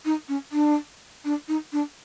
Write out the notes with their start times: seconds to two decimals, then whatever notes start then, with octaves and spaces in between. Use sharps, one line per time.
0.05 D#4
0.29 C#4
0.52 D4
1.25 D4
1.48 D#4
1.73 D4